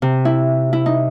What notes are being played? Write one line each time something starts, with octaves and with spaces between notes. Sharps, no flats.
C3
E4
E4
D#4